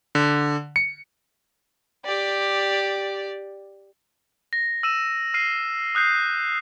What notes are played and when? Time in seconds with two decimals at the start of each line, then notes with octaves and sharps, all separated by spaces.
0.15 D3
0.76 C#7
2.05 G4 D5
4.53 A#6
4.83 E6 D#7 E7
5.34 F6 C7 D#7
5.95 D#6 F#6 G6 C7